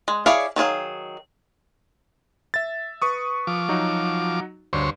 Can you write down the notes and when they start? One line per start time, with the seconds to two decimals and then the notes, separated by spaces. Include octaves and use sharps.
0.08 G#3
0.26 E4 G#4 C#5 D5 F5
0.56 D#3 F#3 G#4 F5
2.54 E5 A6
3.02 B4 C#6 D#6
3.47 F3 D6
3.69 F#3 D#4 F#4
4.73 D2 G2 C5 C#5